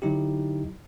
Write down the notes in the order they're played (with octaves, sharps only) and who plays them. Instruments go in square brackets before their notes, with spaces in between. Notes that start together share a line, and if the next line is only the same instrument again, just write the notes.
[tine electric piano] D3 F#3 D#4 E4 G4